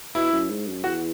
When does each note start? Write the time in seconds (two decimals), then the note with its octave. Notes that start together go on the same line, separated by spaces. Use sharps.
0.15 B2 E4
0.32 F#2
0.49 G#2
0.67 F#2
0.83 E2 F#4